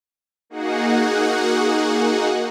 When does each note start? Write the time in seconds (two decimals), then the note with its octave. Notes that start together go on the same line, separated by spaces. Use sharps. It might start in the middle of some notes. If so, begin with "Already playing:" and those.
0.50 A#3 D#4 F#4 G#4 F#5